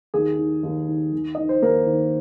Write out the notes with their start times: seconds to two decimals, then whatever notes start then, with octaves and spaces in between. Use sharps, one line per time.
0.14 D#2 G#4
0.39 D#3
0.63 D#2
0.88 D#3
1.12 D#2
1.35 D#3 D#5
1.49 C5
1.62 D#2 A#3 A#4
1.86 D#3